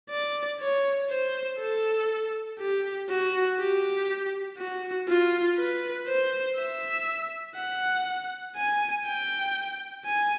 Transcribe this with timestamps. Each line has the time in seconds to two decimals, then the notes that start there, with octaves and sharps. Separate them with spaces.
0.10 D5
0.61 C#5
1.10 C5
1.59 A4
2.59 G4
3.09 F#4
3.59 G4
4.58 F#4
5.08 F4
5.57 B4
6.08 C5
6.58 E5
7.56 F#5
8.56 G#5
9.06 G5
10.05 G#5